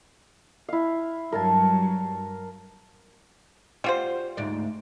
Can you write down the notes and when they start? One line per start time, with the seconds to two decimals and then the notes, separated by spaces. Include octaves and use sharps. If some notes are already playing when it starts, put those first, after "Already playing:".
0.69 E4 F5
1.32 G2 F#3 A#4 F5 A5
3.84 G3 F4 F#4 C5
4.37 D2 G#2 D5